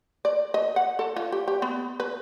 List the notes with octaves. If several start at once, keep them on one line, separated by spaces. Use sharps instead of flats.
D5
D#5
F#5
A4
F4
G4
G4
B3
B4